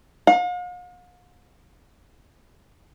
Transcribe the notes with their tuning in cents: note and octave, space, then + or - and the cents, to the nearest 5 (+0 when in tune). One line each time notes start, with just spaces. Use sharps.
F5 +45